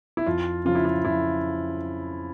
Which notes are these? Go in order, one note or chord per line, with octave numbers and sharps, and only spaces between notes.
E4
F2 F4
C#3 F3 F4
E4
F4
F2 E4